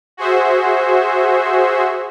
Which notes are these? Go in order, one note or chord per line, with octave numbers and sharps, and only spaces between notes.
F#4 G#4 C5 E5